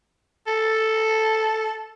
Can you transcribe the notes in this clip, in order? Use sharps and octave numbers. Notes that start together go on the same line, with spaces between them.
A4